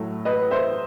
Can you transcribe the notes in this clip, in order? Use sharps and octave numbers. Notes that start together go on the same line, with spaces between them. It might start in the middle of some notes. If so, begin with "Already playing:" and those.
Already playing: A2 F#3 A3
B4 D#5
C5 E5